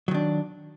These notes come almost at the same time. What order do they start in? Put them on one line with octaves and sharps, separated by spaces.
F#3 D#3 D4